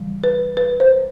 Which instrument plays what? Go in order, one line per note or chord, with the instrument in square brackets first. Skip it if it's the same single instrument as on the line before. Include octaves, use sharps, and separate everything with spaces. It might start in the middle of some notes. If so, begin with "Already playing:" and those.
Already playing: [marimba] C#3 E3 G3
B4
B4
C5